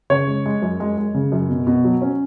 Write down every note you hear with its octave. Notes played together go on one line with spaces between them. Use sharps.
C#3 C#5
G#3
G#3
F#2
G#3
G#3
C#3
F#2
B2
B2
F#3
C#4